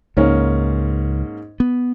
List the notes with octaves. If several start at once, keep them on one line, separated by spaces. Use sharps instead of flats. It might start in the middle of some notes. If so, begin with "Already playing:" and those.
C#2 G#2 A#3 C#4
B3